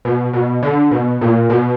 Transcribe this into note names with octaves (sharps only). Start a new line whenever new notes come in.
B2
B2
D3
B2
A#2
B2